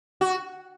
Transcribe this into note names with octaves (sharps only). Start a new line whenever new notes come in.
F#4